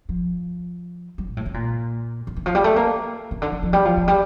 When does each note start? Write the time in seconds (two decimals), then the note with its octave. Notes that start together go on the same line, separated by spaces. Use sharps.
0.09 F3
1.18 G3
1.27 A#2
1.37 A2
1.46 C#3
1.54 A#2
2.27 D3
2.36 E3
2.46 F3
2.55 G3
2.64 A3
2.76 A#3
3.31 C#3
3.42 D3
3.52 E3
3.63 F3
3.73 G3
3.85 F3
3.97 F3
4.08 G3